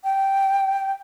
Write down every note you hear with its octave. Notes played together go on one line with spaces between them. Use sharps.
G5